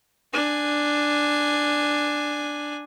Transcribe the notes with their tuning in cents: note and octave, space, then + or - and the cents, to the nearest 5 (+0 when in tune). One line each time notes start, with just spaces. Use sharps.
D4 +5 G#5 +0